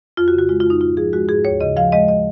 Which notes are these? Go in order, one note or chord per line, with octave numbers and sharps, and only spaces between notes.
F2 F4
F#4
C#3
F#4
G#3 F4
F4
F2 D#4
G#2 F4
F3 G#4
G#3 F#4
G#2 G#4
D#2 C#5
C#3 D#5
F3 F5
G#3 D#5
D#5